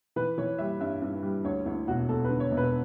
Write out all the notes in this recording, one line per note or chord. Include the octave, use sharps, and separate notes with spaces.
E3 B4
E3 C#5
G3 E5
G2 E5
G2
G3
D2 C#5
D2 E4
E1 F#4
E1 A4
D3 B4
C#5
E1
B4